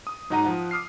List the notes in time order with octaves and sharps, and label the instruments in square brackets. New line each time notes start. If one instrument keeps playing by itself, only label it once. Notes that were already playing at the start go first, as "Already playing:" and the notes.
[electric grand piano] D#6
G#2 F#3 D#4 F#5 A#5 D#7
F3 F#5
D6 D#6 F6 C7